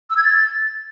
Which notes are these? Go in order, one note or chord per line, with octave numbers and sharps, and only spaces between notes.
E6
G#6
A6